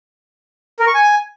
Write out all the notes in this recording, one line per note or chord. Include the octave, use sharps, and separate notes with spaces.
A#4
C#6
G#5